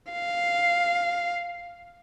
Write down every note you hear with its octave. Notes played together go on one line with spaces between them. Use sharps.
F5